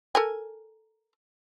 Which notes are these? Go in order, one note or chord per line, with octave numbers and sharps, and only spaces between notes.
A4 A#4 G#5